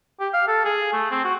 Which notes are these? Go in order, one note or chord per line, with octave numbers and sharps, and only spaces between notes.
G4
F5
A4
G#4
A3
C4
F#4